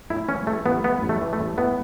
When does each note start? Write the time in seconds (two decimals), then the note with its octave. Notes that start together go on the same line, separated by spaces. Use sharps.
0.10 A2 E4
0.29 E3 C#4
0.47 E3 A3
0.66 A1 B3
0.84 A2 B3
1.02 A1
1.09 A3
1.21 E3
1.33 A3
1.39 A1
1.58 A2 B3